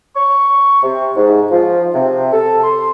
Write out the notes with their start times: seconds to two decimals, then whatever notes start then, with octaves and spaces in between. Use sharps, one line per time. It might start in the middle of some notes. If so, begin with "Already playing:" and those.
0.16 C#6
0.83 C3
1.16 G#2
1.51 F3
1.94 C3
2.32 A4
2.64 C6